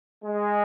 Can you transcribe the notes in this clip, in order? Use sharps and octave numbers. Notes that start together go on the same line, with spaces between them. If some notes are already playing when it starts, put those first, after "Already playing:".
G#3